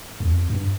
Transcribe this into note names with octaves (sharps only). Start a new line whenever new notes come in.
E2
F2
G2